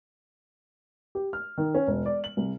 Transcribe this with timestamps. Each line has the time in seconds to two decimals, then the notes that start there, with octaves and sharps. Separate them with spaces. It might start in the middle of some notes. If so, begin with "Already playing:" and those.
1.15 G4
1.33 F6
1.58 D#3
1.75 C#4
1.87 E1
2.06 D5
2.24 F#7
2.37 C2